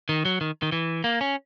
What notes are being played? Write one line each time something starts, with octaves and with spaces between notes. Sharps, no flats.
D#3
F#3
D#3
D#3
E3
A#3
C#4